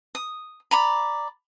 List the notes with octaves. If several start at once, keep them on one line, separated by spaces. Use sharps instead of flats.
D#6
D5 A#5 B5